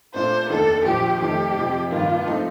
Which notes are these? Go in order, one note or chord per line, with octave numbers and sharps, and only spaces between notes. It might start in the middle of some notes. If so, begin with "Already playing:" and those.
A#2 A3 D4 F4 C5
F1 D#2 D#3 A3 D4 A4
A#1 A#2 F3 G4
F2 D#3 A3 G4
F2 C3 F3
G2 D#3 A#3 F4
F3 A3 C4 D#4